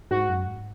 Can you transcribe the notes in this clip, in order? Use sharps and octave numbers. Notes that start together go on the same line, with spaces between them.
G#2 F#4
F#2
G#2